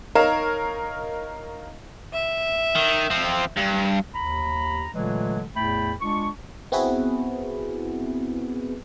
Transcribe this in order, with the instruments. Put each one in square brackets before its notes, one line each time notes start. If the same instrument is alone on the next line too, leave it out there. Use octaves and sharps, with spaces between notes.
[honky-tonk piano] D#4 A#4 C#5 F5 E7
[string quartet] E5
[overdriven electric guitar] D#3
F3 C4
G2
[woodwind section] D#2 A#5 B5
A#2 D3 E3 F#3 G#3 A3
E2 A2 A3 G5 B5
G#3 D4 F4 C#6
[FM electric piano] B3 C4 E4 F#4 G#4 B4